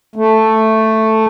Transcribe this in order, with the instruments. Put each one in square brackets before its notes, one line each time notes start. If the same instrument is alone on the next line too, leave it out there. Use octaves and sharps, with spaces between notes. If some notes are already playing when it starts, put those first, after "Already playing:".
[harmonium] A3